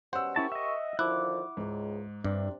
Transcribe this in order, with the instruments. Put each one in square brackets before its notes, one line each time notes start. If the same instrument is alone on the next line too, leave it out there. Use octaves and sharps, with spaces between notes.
[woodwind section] B2 G3 C#4 [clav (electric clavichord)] C5 [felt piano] F#5 E6
[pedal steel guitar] C#4 E4 A5 [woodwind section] G4 A#4 C#6
[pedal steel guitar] D#5 E5
[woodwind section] D3 D#3 F3 [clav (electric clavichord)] E4 [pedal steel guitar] D6 F#6
[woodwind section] C#2 [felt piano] G#2
[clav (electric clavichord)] G2 [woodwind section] C3 [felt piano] D4